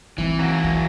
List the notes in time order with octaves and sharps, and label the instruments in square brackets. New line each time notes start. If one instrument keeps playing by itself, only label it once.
[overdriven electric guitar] E3 [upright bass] C4 D#4
[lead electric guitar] F#3 A#3
[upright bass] F4